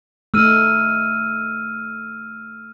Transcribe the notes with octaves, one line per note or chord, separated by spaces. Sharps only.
A3 D#4 E6 F6 D#7